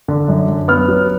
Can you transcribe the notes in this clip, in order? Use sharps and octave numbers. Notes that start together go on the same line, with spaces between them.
D3
F#2
F#2
B3 F6
F#3